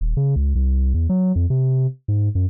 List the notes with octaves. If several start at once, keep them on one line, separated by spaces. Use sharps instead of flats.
D#1
C#3
C#2
C2
E2
F#3
F2
C3
G#2
F#2